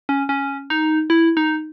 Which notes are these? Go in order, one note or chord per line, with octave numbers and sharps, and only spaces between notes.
C#4
C#4
D#4
E4
D#4